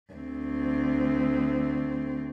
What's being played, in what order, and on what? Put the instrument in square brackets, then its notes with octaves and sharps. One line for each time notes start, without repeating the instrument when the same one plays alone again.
[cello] D2 C4